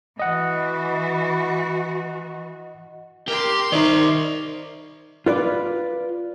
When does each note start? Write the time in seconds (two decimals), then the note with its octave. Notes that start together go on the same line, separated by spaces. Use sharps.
0.19 E3 F#4 D#5 F#5
3.28 G4 A#4 C6
3.72 D#3 D#4 C5 D5
5.26 F4 B4 D5